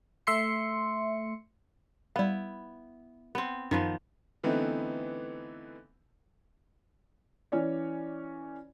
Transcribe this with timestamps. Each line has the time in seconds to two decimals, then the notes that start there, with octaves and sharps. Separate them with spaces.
0.27 A3 E5 C6 C#7
2.16 G3 B3 E4 F5
3.35 B3 C4
3.71 F#2 D#3 F3 B3
4.43 D3 E3 A3 B3 C4 D#4
7.52 E3 C#4 C#5 D5